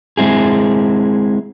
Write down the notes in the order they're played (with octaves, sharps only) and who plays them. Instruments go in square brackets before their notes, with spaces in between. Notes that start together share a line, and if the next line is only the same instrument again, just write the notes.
[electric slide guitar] G#3 C4 E4 G#4